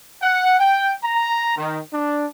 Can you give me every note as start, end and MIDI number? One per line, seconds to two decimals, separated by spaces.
0.22 0.59 78
0.60 0.94 79
1.03 1.56 82
1.57 1.80 51
1.93 2.26 62